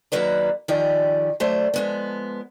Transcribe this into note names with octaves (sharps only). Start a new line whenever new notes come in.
D#2 F3 F#3 A#3 B4 D5
D#3 F3 G4 G#4 D5
F#3 A3 C5 D5
F3 G#3 B3